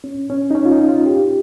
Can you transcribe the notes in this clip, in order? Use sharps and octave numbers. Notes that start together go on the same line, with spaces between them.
C#4
C#4
D#4
C#4
F4
D#4
F4
G4